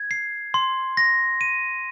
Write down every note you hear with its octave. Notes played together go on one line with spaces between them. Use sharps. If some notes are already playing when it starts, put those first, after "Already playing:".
Already playing: G#6
C7
C6
A#6
D#7